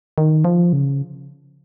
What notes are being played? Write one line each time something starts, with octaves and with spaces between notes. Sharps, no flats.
D#3
F3
C#3